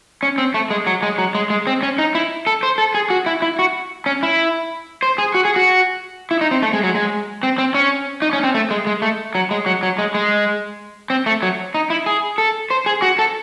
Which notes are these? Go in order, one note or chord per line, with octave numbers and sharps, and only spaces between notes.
C#4
C4
A3
G#3
F#3
G#3
F#3
G#3
G#3
C4
C#4
D#4
E4
A4
C5
A4
G#4
F#4
E4
E4
F#4
C#4
E4
C5
G#4
F#4
G#4
F#4
E4
D#4
C4
A3
G#3
F#3
G#3
C4
C4
C#4
D#4
C#4
C4
A3
G#3
G#3
A3
F#3
G#3
F#3
F#3
G#3
G#3
C4
A3
F#3
D#4
E4
G#4
A4
C5
G#4
F#4
A4